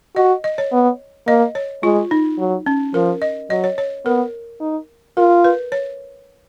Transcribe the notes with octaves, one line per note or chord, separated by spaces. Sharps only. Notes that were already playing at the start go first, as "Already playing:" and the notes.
F#4 D#5
D#5
C#5
B3
A#3 D#5
C#5
G#3 F4
D#4
F#3
C#4
F3 A#4
D#5
F#3 D#5
C#5
C#5
B3 A#4
D#4
F4 A#4
B4
C#5